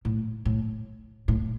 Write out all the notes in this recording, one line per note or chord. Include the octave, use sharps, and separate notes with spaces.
A2
A2
A2